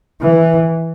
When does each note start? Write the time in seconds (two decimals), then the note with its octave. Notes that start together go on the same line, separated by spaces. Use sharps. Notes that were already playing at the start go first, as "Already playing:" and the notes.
0.21 E3